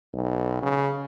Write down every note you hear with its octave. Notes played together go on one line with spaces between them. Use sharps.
B1
C#3